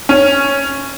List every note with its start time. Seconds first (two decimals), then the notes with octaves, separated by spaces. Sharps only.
0.09 C#4